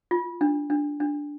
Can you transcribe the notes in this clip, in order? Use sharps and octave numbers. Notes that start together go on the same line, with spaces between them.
F4
D4
D4
D4